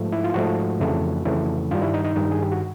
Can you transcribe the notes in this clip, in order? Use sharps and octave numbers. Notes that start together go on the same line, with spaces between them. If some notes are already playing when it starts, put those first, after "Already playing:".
Already playing: G#2 F3 A3
E4
F4
G#2 F3 A3 F#4
F2 C#3 E3 A3
F2 C#3 E3 A3
G2 D#3 G3 F4
E4
D#4
D#4
G2 D#3 G3 D#4
G#4
G4
F#4